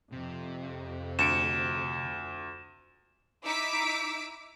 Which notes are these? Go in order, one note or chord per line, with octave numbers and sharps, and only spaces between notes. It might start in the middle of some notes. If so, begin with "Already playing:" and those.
F2 C3
D2 C#7 D7 E7
D#4 E4 D6 E6 B6 D7